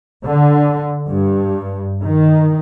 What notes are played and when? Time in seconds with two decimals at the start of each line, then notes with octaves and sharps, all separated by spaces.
0.25 D3
1.07 G2
2.05 D#3